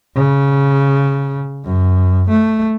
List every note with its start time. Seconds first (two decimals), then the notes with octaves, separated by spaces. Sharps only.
0.16 C#3
1.65 F#2
2.30 A3